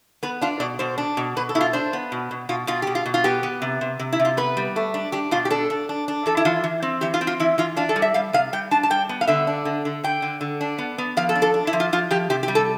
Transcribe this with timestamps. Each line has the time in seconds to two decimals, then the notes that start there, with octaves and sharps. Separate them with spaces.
0.23 B3 B4
0.41 D4 F4
0.60 B2 D5
0.79 B2 C5
0.98 D4
1.17 B2
1.37 B2 B4
1.49 A4
1.55 B2 E4
1.61 F4
1.73 D4 C5
1.93 B3
2.12 B2
2.31 B2
2.49 B2 F4
2.67 B2 F4
2.82 B2 G4
2.95 F4
3.06 B2
3.14 F4
3.24 B3 G4
3.43 B3
3.62 C3
3.81 C3
3.99 C3
4.13 E4
4.19 C3
4.25 F4
4.37 B3 B4
4.57 G3
4.76 A3
4.94 D4
5.12 D4 G4
5.31 B2 F4
5.45 G4
5.50 D4 A4
5.70 D4
5.89 D4
6.08 D4
6.26 E3 A4
6.37 E4
6.45 E3 F4
6.64 E3
6.83 C4
7.01 E3 G4
7.14 F4
7.21 C4
7.27 F4
7.40 E3 E4
7.58 E3 F4
7.77 D4 F4
7.89 A4
7.96 G3
8.02 E5
8.14 G3 F5
8.33 C3 F5
8.53 G3 G5
8.71 D4 A5
8.83 A5
8.90 G3 G5
9.09 B3
9.21 F5
9.27 D3 E5
9.47 D4
9.65 D3
9.85 D3
10.04 D3 G5
10.22 D3
10.41 D3
10.61 D4
10.78 B3
10.98 B3
11.17 F3 F5
11.29 A4
11.35 D4
11.42 A4
11.54 D4
11.67 E4
11.73 F3
11.80 F4
11.93 F3 F4
12.11 F3 G4
12.30 C3 G4
12.43 G4
12.48 G3
12.55 A4